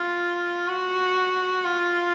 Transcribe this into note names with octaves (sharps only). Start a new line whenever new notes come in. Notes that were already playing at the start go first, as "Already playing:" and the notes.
Already playing: F4
F#4
F4